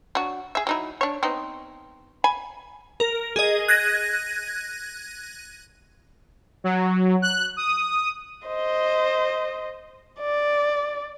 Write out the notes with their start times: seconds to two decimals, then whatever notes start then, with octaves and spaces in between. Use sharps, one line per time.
0.15 F#3 D4 F#4
0.55 G#4 E5
0.67 F#3 D#4 E4
1.01 D4 C#5
1.23 B3 C4 D#4
2.24 G#5 B5
3.00 A#4
3.36 G#4 D#5
3.68 F#6 G#6 A#6 D#7
6.64 F#3
7.22 F#6
7.57 D#6
8.48 C5 D#5
10.19 D5